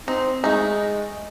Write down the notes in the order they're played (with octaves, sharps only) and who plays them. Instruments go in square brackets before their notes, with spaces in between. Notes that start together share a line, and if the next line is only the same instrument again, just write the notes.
[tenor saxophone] C4 [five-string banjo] D#4
[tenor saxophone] G#3 [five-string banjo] A3 D#4